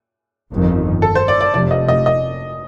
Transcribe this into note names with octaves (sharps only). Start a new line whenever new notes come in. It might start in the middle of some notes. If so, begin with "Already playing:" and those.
G1 F2 D#3
A4
C5
D5
D5
F1 F2 C3 F3 D5
D#5
D#5
D#5